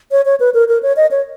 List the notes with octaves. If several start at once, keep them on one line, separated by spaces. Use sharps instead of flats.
C#5
C#5
B4
A#4
A#4
C#5
D#5
C#5